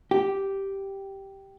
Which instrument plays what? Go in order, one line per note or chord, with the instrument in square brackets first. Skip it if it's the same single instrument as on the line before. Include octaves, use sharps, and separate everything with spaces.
[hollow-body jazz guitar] G4